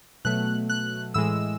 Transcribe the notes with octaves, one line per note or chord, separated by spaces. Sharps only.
B2 F#3 A3 F#6
F#6
A2 E3 G#3 E6